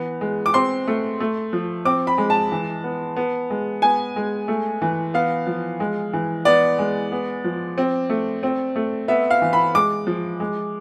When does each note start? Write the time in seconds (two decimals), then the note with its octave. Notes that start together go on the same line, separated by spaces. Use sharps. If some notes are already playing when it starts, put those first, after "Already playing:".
Already playing: E3 B3
0.21 G#3
0.46 D6
0.54 C4 C6
0.88 A3
1.20 A3
1.53 F3
1.85 C4 D6
2.07 B5
2.18 G#3
2.30 A5
2.52 E3
2.84 B3
3.16 B3
3.50 G#3
3.82 B3 G#5
4.16 G#3
4.48 A3
4.82 E3
5.14 B3 F5
5.47 F3
5.80 G#3
6.13 E3
6.45 B3 D5
6.79 G#3
7.12 B3
7.44 F3
7.78 C4
8.10 A3
8.43 C4
8.76 A3
9.08 B3 E5
9.30 F5
9.42 E3
9.53 B5
9.75 G#3 D6
10.07 F3
10.40 G#3